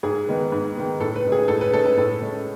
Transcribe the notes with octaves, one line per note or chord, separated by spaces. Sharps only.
G#2 G#4
D#3 G#3 B3
G#2
D#3 G#3 B3
A2 A4
B4
G#3 C#4
G#4
A2 A4
B4
G#3 C#4 A4
B4
A2 A4
G#3 C#4